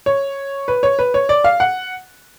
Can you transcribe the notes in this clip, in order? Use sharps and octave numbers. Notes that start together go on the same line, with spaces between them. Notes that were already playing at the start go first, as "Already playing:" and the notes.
C#5
B4
C#5
B4
C#5
D5
F5
F#5